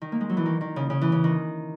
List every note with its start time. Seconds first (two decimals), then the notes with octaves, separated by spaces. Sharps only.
0.02 D#3
0.12 A#3
0.21 G#3
0.29 F#3
0.37 E3
0.46 D#3
0.61 D#3
0.76 C#3
0.90 C#3
1.01 E3
1.12 C#3
1.24 D#3